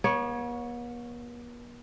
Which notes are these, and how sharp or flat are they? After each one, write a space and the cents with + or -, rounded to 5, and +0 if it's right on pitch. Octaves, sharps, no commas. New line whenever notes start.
B3 -45 C#5 +0